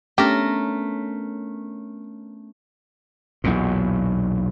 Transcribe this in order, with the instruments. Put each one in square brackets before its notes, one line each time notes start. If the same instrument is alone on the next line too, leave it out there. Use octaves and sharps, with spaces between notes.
[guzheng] A3 A#4 [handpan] B3 C#4 D4 [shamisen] G4
[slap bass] B1 E2 A#2